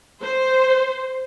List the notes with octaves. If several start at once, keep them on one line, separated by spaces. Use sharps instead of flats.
C5